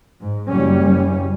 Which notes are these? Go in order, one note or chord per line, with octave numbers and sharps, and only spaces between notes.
G#2
F#1 G3 C#4